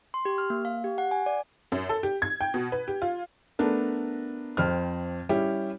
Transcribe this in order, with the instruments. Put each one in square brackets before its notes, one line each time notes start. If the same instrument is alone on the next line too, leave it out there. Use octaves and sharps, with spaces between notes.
[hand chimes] C6
G4
F6
A#3
F5
G4
F#5
G#5
D5
[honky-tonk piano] F#2
A4
G4
G#6
G5
B2
B4
G4
F4
[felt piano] A3 B3 D4 A#4
F2 C4 F6
G3 C#4 E4 G4